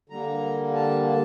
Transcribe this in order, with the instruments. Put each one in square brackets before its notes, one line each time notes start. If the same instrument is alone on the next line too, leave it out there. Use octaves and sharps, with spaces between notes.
[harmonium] D3 G3 A#3 A#5
A5
A5